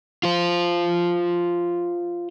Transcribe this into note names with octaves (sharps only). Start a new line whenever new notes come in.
F4 C5